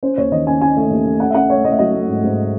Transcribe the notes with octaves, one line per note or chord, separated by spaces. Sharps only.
C#4 C5
D#2 C#5
D#3 D#5
C#4 G#5
C#4 G#5
A3
D#2
A3
C#4 F#5
E5
C#4 F#5
A3 C#5
A3 D#5
E5
F#3 D#5
A3
G#2
G#2